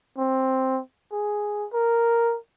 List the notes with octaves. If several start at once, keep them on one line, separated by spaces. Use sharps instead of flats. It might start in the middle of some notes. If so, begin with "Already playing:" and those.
C4
G#4
A#4